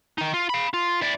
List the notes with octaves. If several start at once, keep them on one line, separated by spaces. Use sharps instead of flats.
D#3 D#4
F4
F5 B5
F4
E4 D5